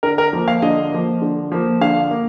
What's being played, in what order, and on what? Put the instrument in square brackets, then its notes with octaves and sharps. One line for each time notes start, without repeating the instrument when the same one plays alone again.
[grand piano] D3 A#4
A#4
F3 A#3
F5
D3 D#5
F3 A#3
D3
F3 A#3
D3 F5
A#3